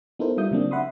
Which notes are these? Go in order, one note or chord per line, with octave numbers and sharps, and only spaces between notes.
B3 D#4 E4 A4 A#4 C5
G3 F4 E5 D#6 G6
C#3 F#3 A#3 C4 D4
E5 F#5 B5 C6 D#6